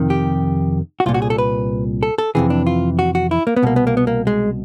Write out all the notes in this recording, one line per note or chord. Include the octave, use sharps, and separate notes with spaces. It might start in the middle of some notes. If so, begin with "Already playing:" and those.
Already playing: F2 C3 D#3
G4
F#4
C2 A#2 F4
F#4
G#4
A4
B4
A4
A4
F2 C3 E3 G#4
D4
F4
F#4
F#4
E4
A#3
B3
C2 B2 A#3
B3
A#3
B3
A#3
G#3